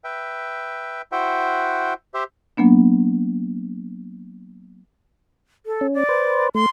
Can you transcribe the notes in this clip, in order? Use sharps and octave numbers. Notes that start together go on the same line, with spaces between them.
B4 E5 G5
E4 F#4 C5 E5 F#5 G5
G4 C5 E5
F#3 A#3 B3 D4
A4
C#4
D5
B4 C5
A3 C6